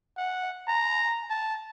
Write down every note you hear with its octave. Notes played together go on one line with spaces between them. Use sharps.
F#5
A#5
A5